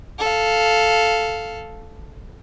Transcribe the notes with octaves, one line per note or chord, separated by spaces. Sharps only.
A4 F5